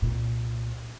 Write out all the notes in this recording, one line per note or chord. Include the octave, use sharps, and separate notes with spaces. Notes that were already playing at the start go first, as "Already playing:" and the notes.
C2 A#2